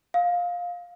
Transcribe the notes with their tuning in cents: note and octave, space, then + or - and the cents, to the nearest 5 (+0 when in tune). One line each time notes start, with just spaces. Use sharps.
F5 +15 D#6 +45